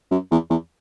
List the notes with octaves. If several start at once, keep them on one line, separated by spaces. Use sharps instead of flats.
F#2
E2
E2